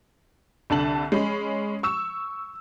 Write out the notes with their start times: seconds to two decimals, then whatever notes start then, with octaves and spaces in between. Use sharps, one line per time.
0.70 C2 D3 A5 F#7
1.12 G#3 C#4 B5
1.83 C#6 E6 E7